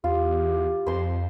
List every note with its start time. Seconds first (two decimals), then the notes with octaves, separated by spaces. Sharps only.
0.04 E2 F4 G4
0.87 F2 C5 C6